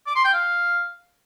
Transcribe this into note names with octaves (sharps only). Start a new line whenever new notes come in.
D6
C6
G5
F5